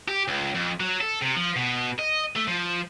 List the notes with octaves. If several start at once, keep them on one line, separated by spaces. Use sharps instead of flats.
G4
C#2
F2
F#3
A4
C3
F3
B2
D#5
A3
F3